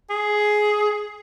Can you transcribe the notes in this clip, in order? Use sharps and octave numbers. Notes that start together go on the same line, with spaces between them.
G#4